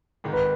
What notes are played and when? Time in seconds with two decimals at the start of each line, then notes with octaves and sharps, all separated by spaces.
0.24 G#1 G#2 D#3 G#3 D#4
0.33 B4